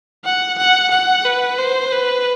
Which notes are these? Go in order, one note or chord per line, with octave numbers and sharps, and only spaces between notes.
F#5
F#5
F#5
B4
C5
B4